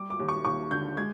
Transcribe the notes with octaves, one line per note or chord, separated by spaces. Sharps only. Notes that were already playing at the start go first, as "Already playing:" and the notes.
Already playing: G3 D6
D6
D#2
C#6
D#2 C#6
D3 G6
G#3 G#6